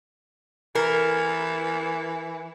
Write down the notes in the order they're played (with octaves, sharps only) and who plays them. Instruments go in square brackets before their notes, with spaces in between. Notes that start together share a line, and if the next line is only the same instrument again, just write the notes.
[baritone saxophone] E3 [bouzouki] A#4